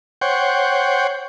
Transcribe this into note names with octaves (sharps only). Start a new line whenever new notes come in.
C5 C#5 F#5 G5